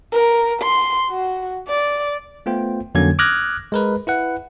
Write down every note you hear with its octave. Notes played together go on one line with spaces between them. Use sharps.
A#4
C6
F#4
D5
A3 B3 F4 C5 G5
F2 D3 F#3 A#3 C#4 G#6
D6 D#6 F6 F#6 G#6 A#6
G#3 A#4 B4
E4 B4 F#5